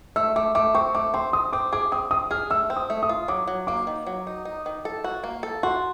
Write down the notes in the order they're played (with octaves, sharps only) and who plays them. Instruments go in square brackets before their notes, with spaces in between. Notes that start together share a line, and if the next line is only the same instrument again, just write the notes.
[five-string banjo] A3 [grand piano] E6
[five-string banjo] A3 [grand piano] D6
[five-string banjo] A3 [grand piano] D6
[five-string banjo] C4 [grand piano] C#6
[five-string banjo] A3 [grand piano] D6
[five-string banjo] C4 [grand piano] C6
[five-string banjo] C4 [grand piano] D#6
[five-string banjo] C4 [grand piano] D6
[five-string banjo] G#4 [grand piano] D6
[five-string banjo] C4 [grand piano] D#6
[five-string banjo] C4 [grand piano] D#6
[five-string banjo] G#4 [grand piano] F6
[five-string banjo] A3 [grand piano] E6
[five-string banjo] C4
[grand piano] D#6
[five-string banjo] A3
[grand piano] D#6
[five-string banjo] F4
[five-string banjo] F#3 [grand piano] D6
[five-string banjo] F#3
[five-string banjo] A#3 [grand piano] D6
[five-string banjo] D#3
F#3
D#4
D#4
D#3
A4
F#4
A#3
A4
[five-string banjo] F#4 [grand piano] C6